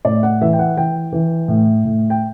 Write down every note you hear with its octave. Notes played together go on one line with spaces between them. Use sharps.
A2 D5
F#5
E3 E5
G5
F#5
E3 G5
E3
A2
A2
G5